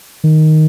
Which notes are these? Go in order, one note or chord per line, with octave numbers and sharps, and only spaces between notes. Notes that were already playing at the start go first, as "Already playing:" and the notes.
D#3